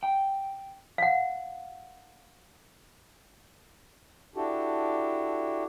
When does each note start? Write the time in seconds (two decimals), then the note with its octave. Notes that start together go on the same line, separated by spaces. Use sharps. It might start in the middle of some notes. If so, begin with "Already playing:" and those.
0.03 G5
0.98 F5 F#5
4.36 D4 E4 F#4 G4 A4